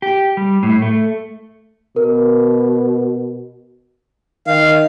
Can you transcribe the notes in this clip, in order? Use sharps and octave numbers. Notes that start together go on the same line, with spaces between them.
G4
G3
A2
A3
B2 A#4
D#3 F5